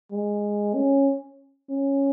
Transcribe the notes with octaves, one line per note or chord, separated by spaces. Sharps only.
G#3
C#4
C#4